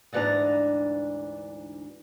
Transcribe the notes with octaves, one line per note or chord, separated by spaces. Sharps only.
D2 G#2 E3 D4 A5 A#5